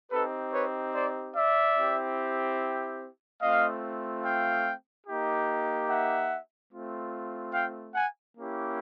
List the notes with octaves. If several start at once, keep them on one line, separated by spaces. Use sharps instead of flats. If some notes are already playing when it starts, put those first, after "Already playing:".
C4 D#4 G4 A4 B4
B4 C#5
C5 D5
D5 E5
C4 E4 G4
A3 C4 F4 D#5 F5
F5 G5
A#3 D#4 G4
E5 F#5
A3 C4 F4
F5 G5
F#5 G#5
A#3 C#4 E4 G4